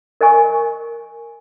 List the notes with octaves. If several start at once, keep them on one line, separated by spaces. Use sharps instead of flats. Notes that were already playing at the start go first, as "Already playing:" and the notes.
A#4 D#5 G#5 C#6